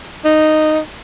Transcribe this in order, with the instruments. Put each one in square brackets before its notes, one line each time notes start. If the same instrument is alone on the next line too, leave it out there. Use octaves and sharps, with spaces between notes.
[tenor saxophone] D#4